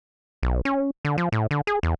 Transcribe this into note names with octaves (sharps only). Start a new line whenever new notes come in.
B1
C#4
D3
F3
A2
D3
G#4
E2